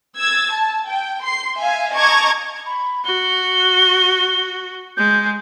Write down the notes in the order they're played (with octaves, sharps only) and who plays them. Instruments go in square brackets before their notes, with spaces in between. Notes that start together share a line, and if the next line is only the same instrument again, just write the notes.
[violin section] E6 G#6 A6
A5
G5
C6 C7
E5 F5 G#5
D#5 A5 A#5 C#6 D6 G#6
[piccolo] B5
[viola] F#4 [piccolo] G7
[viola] G#3 [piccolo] G6